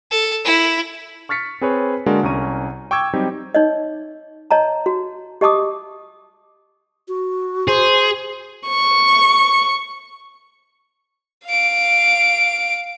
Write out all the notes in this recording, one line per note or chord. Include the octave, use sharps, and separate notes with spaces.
A4
E4
C#6 F6 A6 B6 C#7
C4 G#4 B4 C#5
D3 G#3 A#3 D4 F#4 A#4
C2 C#4 A#5 C#6 D#7
G5 C#6 D6 E6 G#6
F#3 G3 C4 D#4 G4
D#4 C#5 D#5
C#5 D#5 A5 A#5
F#4
G4 D#5 A5 D6 D#6
F#4
G#4 C5
C#6
F5 D7